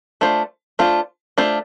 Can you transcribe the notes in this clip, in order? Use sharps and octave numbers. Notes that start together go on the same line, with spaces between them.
A3 D4 F4 C5
A3 D4 F4 C5
A3 D4 F4 C5